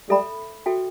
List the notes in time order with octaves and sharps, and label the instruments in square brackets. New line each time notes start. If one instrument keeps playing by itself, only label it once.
[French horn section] G3 [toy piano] A4 E5 B5
[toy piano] F#4 A4 E5 G5